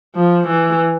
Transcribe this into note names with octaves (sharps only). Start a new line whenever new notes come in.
F3
E3